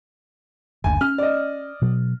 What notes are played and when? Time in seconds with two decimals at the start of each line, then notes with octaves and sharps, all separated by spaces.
0.84 F#1 D2 G#5
1.01 C#4 F6
1.18 D5 D#5
1.82 B2 F#3